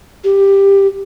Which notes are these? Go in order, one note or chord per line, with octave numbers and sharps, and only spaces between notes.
G4